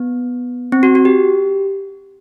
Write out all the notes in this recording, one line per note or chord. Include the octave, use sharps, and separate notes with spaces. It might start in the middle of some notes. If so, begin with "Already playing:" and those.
Already playing: B3
C4
F#4
F#4
G4